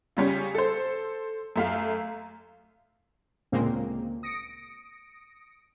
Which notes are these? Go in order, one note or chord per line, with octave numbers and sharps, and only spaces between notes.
C#3 G3 C#4
A4 C5
F#2 A3 F5
D2 A#2 C#3 G#3 A#3 C4
D#6 A#6 C#7 D7